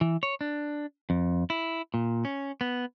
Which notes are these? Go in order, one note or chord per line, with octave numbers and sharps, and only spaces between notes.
E3
C#5
D4
F2
E4
A#2
C#4
B3